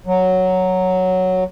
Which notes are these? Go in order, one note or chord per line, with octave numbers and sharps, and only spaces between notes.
F#3